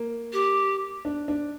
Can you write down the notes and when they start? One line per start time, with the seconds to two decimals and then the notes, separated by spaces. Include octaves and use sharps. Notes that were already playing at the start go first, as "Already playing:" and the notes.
Already playing: A#3
0.32 G4
1.05 D4
1.28 D4